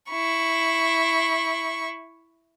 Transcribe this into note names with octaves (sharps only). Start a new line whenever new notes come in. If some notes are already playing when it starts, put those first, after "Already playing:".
E4 C#6